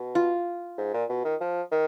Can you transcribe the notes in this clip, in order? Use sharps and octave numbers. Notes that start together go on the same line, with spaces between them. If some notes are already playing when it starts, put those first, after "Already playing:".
Already playing: B2
F4
G#2
A#2
B2
D#3
F3
D#3